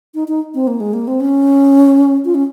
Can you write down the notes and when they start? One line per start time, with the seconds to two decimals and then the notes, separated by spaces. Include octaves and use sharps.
0.14 D#4
0.28 D#4
0.54 C4
0.67 A#3
0.80 G#3
0.93 A#3
1.07 C4
1.20 C#4
2.25 F4
2.35 C#4